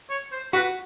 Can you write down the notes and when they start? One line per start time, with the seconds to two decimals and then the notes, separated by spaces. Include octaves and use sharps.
0.10 C#5
0.32 C5
0.53 F#4 B4